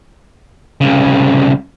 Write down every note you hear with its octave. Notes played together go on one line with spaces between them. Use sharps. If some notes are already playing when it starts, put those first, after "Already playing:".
C2 C#3